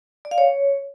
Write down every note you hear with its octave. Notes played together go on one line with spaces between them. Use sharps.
D5
F5
C#5